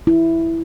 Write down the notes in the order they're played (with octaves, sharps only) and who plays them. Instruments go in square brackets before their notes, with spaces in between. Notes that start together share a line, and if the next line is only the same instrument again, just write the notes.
[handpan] E4